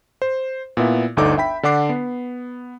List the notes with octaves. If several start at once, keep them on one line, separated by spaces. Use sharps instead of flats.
C5
A#2 B3 E4
G1 D2 D4 D#4 A4 D6
E5 G5 B5 B6
D3 D4 F#5 D6 C7
B3